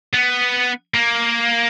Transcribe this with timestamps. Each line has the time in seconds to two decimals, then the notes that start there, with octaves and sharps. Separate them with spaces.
0.13 B3
0.94 A#3